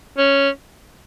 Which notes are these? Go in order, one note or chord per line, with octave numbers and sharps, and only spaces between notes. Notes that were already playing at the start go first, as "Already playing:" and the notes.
C#4